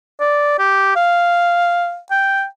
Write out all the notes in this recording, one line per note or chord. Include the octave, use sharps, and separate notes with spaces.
D5
G4
F5
G5